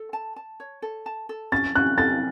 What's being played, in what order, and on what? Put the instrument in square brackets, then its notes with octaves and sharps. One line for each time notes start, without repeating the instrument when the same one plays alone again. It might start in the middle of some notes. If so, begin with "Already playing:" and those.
Already playing: [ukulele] A4
A5
A5
C#5
A4
A5
A4
[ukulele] C#4 [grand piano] A6
[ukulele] C#4 [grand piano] F#6
[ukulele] A4 [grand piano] A6